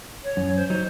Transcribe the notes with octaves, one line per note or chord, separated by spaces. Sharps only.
C#5
F#2
C5
F#3 D#4 C5